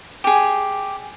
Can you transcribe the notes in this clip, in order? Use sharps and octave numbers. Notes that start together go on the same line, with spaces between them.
G4 G#4